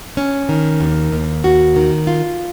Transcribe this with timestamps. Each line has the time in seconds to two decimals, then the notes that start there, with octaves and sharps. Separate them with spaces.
0.17 C#4
0.49 D#3
0.81 D#2
1.12 D#2
1.44 F#4
1.76 D#3
2.07 F4